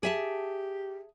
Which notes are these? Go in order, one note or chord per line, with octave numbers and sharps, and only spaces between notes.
G4 G#4 E5 A5